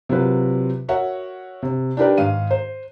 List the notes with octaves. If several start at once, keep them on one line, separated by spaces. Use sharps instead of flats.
C3 F#3 F4 A#4 B4
F#4 A#4 C#5 E5 F#5
C3
D4 D#4 G4 A#4 B4 D5
G#2 D#3 F5 D#7
C5